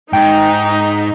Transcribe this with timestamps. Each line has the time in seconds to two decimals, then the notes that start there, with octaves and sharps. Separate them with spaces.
0.13 G#2 D#4 G5